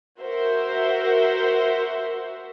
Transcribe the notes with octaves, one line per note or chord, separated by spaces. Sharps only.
F#4 A#4 C5 E5